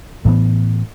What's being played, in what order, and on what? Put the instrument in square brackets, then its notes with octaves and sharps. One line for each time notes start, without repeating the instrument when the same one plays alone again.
[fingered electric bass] A2 E3 B3